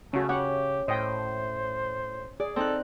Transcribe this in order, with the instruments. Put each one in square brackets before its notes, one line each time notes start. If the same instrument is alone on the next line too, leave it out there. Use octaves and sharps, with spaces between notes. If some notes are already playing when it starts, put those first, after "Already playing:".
[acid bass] C#3 [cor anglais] A3 [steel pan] C#4 F#4
[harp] C#4 [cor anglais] G4 [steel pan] F#5
[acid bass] A2 [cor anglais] C5 [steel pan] D#5 G5
[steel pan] G#4 [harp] D5
[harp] C4 D#4 F#6 [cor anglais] A4